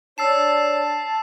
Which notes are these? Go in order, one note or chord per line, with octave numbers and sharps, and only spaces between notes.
D4 C#5 A5 E6 C7 E7